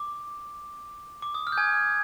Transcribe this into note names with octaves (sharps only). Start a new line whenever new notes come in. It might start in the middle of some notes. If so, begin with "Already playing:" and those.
Already playing: D6
D6
D#6
F6
G6
G#5 G#6